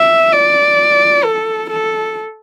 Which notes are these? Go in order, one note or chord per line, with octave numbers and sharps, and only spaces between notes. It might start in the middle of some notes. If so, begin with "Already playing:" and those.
Already playing: E5
D5
A4
A4